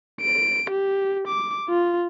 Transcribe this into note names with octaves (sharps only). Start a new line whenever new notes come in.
D7
G4
D6
F4